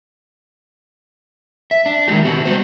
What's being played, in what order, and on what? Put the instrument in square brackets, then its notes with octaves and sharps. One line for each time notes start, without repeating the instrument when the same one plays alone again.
[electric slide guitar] E5
D4
D#3 F#3 G#3 F#4 G4
B3 C4 F#4
G3 F#4 C5